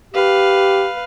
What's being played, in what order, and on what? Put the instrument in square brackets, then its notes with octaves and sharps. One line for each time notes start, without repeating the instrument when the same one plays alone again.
[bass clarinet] G4 [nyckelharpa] B4 F5